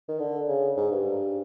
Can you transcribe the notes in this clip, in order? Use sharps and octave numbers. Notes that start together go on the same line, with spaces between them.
D#3
D3
C#3
G#2
G2